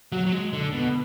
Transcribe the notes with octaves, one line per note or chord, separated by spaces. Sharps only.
F#3
F#3
G#3
D3
B2